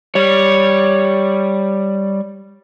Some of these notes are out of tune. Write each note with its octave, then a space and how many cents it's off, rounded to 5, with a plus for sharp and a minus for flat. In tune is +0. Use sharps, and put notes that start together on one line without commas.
G3 +0 C#5 +0